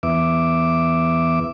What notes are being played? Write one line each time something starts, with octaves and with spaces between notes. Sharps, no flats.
E2 B3 E5 D6